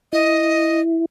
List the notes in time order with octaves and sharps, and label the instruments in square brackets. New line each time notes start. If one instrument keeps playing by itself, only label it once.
[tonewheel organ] E4 [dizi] D#5